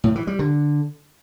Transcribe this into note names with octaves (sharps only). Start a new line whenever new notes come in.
A2
E3
G3
D3